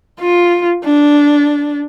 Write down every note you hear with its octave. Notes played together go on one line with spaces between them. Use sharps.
F4
D4